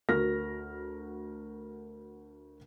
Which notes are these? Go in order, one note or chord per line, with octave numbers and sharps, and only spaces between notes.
D2 F#4 A#4 F6 A#6